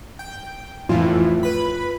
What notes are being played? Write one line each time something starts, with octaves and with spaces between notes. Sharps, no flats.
G5
F2 A2 E3 F4
B4 B5